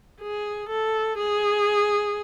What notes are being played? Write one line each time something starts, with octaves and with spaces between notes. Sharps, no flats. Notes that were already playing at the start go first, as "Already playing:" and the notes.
G#4
A4
G#4